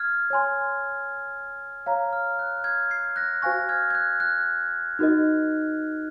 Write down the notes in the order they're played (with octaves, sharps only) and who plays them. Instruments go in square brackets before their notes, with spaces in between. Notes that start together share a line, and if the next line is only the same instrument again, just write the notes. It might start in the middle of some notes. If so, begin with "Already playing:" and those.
Already playing: [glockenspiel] F6 G#6
[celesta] C#5 G#5 C6
C#5 F5 A#5
[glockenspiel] F6
F#6
F6 G#6
G#6 C7
F#6 A#6
[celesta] F#4 C5 F5 G#5 C#6 [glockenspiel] F#6 A#6
[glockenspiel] F6 G#6
G#6
F#6
F#6
[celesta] D#4 F#4 A#4 D#5